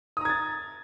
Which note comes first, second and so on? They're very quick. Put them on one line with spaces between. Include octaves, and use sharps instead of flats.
D#6 A#5 G#6 A6